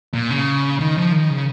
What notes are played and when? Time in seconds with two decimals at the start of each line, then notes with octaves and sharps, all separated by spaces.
0.14 A#2
0.31 C#3
0.80 D#3
0.97 F3
1.12 D#3
1.30 C#3